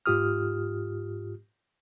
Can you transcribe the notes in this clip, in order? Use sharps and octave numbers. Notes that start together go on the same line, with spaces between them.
G#2 F4 G4 D#6 F6